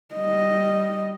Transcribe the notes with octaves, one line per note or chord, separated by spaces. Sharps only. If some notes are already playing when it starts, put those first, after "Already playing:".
G3 D#5